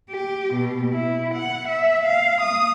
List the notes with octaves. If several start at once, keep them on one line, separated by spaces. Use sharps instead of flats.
G4
B2
E4
F#5
E5
F5
D#6